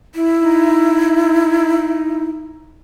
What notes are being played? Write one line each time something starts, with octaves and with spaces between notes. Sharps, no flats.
E4
D#4